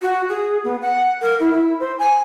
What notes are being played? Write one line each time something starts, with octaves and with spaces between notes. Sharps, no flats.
F#4
G#4
B3
F#5
A#4
E4
E4
C5
G#5